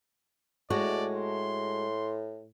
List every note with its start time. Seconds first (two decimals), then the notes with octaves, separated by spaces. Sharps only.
0.70 A2 G#3 A3 F#4 D5
1.15 C6